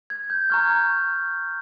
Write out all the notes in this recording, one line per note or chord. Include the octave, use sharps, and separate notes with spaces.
G#6
G6
A#5 C#6 F6 G#6